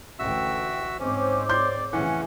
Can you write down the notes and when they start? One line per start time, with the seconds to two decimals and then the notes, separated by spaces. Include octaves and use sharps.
0.19 A1 D2 F#4 E5 G5 E6
1.00 G#2 C4 C#4 C5 C#5 D6
1.49 D5 C6 G6
1.93 F2 A2 C#3 E3 C#4 F#5